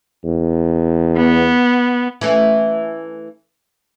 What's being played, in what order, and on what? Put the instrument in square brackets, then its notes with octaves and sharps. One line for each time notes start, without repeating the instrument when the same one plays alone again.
[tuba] E2
[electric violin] B3
[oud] E3 A3 C#4